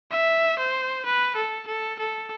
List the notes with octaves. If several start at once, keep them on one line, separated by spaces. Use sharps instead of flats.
E5
C5
B4
A4
A4
A4